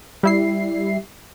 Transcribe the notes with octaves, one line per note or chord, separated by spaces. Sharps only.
G3 E4 C7